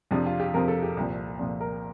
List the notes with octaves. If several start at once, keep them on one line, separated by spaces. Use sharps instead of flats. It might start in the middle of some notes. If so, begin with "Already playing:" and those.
F2 C3 F3 D4
F4
G4
F2 C3 F3 A#4
A4
G4
C2 A#2 F3
C2 A#2 F3
A#4